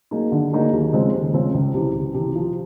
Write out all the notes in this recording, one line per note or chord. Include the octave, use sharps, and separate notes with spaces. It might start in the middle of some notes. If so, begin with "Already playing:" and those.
F#3 A#3 D#4 G#4
D3
F#3 A#3 D#4 G#4
D#2
C#3 F3 G#3 C4
D#2
C#3 F3 G#3 C4
C#2
C3 E3
C#2
C3 E3
F3